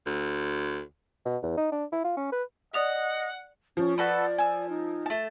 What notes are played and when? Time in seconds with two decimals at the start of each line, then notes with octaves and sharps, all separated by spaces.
0.06 D2
1.25 B2
1.42 E2
1.57 D#4
1.72 D4
1.92 E4
2.04 F4
2.17 C#4
2.32 B4
2.74 D5 D#5 F#5 D#6 F7
3.77 F3 C#4
3.98 F#4 A4 B4 D5
4.38 G#5 E6
4.69 D#4
5.06 A3 A5